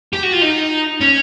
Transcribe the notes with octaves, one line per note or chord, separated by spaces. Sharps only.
G4
F#4
F4
D#4
C#4